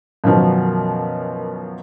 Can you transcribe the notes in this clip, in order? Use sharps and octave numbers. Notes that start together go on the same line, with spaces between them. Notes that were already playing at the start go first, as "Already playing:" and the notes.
F#2 B2 D#3 F3 F#3